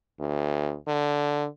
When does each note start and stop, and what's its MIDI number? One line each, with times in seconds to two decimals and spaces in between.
0.19 0.75 38
0.88 1.47 50